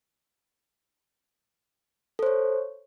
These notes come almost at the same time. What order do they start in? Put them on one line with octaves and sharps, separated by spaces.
A4 C5 C#5